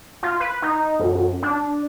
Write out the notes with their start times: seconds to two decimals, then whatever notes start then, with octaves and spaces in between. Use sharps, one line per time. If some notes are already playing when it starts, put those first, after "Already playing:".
0.23 F4
0.40 B4
0.62 D#4
0.99 F#2
1.15 F#2
1.43 D4